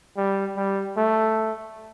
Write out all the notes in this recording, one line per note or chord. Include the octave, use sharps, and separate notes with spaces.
G3
G3
A3